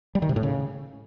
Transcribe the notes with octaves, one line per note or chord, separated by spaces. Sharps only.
G3
D#3
C3
A2
C#3